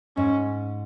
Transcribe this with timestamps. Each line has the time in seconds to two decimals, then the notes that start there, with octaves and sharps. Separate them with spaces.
0.17 G#2 C#4